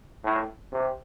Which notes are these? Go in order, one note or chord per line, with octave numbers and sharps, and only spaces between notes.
A2
C3